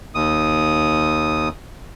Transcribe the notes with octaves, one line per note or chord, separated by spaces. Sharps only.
D#2 D#6